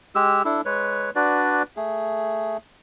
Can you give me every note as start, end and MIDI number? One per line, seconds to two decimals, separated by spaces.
0.15 0.42 56
0.15 0.42 67
0.15 0.42 88
0.45 0.61 62
0.45 0.61 64
0.45 0.61 69
0.65 1.10 56
0.65 1.10 71
0.65 1.10 73
1.15 1.63 62
1.15 1.63 66
1.15 1.63 71
1.15 1.63 74
1.77 2.57 57
1.77 2.57 68